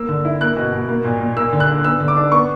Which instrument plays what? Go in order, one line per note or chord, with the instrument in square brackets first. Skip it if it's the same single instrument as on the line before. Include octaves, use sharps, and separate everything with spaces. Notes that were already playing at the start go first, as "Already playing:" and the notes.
Already playing: [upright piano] A#3 E6
D3
E4
A#3 F#6
B2
B2
A#3
A#2
A#2
A#3 E6
D3
F#6
D4
B3 E6
D3
D6
D4
B3 C#6